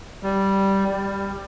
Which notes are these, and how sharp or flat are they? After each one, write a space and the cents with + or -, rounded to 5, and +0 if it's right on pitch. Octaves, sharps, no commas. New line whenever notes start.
G3 -5
G3 +15